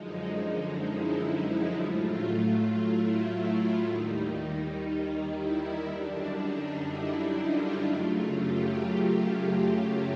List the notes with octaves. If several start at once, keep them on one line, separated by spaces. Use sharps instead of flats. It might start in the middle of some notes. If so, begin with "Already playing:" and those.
Already playing: F#2 D3 F3 G#3 D#4
E4
A2 F#3 A3 F4
E4
E4
D#2 D#3 G3 D#4
E4
F#2 D3 G3 D4
D#4
E4
F4
F#2 C#3 F#3 A3 F4
G4